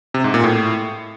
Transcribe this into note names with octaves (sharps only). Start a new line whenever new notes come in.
C3
G#2
A#2
A2